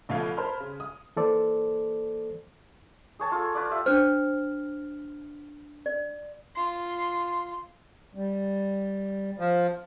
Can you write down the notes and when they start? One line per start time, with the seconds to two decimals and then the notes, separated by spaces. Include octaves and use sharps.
0.09 A1 B2 F3 A3 F5 G#6
0.37 A#4 C5 A5 B5 C6 F6
0.60 C#3
0.80 D#6
1.17 E3 A#3 A4 C5 D5
3.19 G#4 C#5 A5 C#6
3.32 F4 A4
3.55 F4 B4 D5
3.71 G4 E5
3.86 D4 C5 F6
5.86 D5
6.55 F4 C6
8.15 G3
9.39 F3